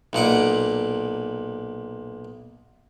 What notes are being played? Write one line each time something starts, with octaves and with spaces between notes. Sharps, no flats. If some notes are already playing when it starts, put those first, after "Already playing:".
B1 A#2 F#5 D6